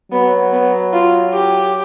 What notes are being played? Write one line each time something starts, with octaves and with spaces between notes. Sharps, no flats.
F#3 B3
B3
F4
G4